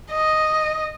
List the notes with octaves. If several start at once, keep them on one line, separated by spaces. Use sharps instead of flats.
D#5